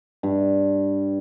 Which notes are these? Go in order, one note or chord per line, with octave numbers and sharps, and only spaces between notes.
G2